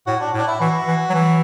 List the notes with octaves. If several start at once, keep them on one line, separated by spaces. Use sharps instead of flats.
A2 F#4
D4
A2
D4
E4
E3 F#4
E3
F#3
E3